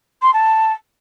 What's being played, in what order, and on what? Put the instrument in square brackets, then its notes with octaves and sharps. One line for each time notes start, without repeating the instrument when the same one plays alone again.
[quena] C6
A5